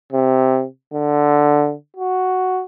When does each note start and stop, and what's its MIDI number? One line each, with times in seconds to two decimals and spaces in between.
0.13 0.64 48
0.93 1.74 50
1.97 2.63 66